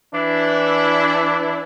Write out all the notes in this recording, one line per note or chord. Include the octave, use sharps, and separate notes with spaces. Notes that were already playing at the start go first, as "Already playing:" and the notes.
E3 D4 E4